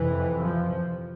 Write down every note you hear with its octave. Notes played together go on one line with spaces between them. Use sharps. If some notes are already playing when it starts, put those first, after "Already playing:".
Already playing: F2 C3 E3
F3